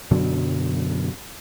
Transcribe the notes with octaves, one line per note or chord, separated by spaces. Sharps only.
F#2 B2 D3 F#3